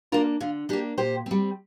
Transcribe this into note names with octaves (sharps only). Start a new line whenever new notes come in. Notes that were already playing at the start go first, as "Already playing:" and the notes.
A#3 D4 F4 A#4
D3 F4
A#3 D4 G4
A#2 G4 C5
G3 C4